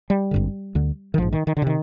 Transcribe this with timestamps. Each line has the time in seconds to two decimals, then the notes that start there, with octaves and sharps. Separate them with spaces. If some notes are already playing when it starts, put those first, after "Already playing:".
0.10 G3
0.31 G#1 G2 D3
0.75 D2 D3
1.14 D#3
1.18 A#1 G#2 F3
1.33 D#3
1.47 D#3
1.57 D3
1.62 C3 D#3